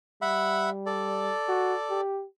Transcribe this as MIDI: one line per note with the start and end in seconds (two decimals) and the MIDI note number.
0.22 1.32 55
0.22 0.70 76
0.22 0.70 78
0.22 0.70 83
0.86 2.01 69
0.86 2.01 74
1.49 1.74 66
1.90 2.25 67